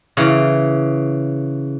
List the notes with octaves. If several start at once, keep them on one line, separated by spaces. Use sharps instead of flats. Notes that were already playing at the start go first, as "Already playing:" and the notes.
C#3 E3